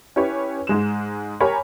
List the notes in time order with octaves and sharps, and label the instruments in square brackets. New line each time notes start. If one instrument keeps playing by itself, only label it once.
[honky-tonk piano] C#4 E4 G4 B4 C#5
G#2 G#3 E7
G4 A#4 C#5 G#5 A#5 B5